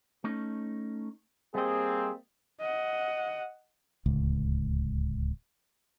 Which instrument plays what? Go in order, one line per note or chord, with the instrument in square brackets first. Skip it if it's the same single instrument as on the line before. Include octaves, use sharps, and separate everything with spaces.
[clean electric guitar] A3 C#4 D#4
[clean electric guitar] G3 D#5 [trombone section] A#3 C4 [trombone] G#4
[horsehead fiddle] D#5 F#5
[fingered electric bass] D1 C#2